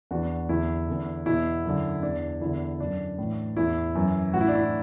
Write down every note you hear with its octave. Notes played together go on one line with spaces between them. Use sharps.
E2 E3 D4 F#4
E2 D3 E4
E2 D3
E2 B2 E4
F#2 D3
E2 E3 D4
E2 D3 E4
F#2 D3 D4
A2 E3
E2 E3 E4
F#2 E3
A2 E3 F#4
E4
D4
E4